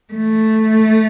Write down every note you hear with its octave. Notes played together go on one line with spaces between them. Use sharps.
A3